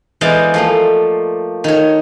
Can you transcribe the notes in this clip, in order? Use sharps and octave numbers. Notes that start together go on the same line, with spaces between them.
E3 G#3 B3 C5 D5 F5
F3 A3 A#3
D#3 C#5